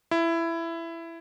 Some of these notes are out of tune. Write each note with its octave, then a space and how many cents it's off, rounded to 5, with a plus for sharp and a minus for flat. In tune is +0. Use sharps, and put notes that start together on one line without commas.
E4 +15